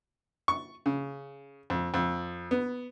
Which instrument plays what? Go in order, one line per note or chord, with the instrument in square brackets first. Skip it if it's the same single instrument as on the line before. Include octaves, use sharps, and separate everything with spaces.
[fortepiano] C#6
C#3
F2
F2
B3